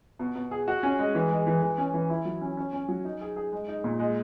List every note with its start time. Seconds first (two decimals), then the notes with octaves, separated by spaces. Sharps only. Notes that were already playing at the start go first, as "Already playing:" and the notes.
0.19 B2
0.35 B2
0.51 G#4
0.68 F#4
0.83 C#4
0.99 G#3
1.15 E3
1.31 G#3
1.47 E3
1.62 E3
1.78 C#4
1.94 E3
2.10 E4
2.25 F#3
2.41 C#4
2.57 C#4
2.73 C#4
2.89 F#3
3.05 D#4
3.21 G#4
3.36 G#4
3.52 G#3
3.68 D#4
3.84 A#2
3.99 G#3